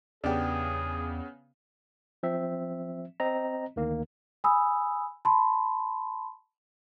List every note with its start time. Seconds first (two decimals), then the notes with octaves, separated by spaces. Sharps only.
0.24 E2 C#3 B3 D4 G4 G#4
2.23 F3 C4 E5
3.20 C4 D#5 A#5
3.76 D2 D#3 A#3
4.44 G#5 B5 D#6 E6
5.25 A5 B5 C6